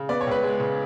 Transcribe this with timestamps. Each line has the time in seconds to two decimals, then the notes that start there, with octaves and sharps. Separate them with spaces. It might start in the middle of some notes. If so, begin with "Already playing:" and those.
Already playing: C#3
0.09 B3 D5
0.21 C#5
0.27 C#2 B4
0.43 G#3
0.60 C#3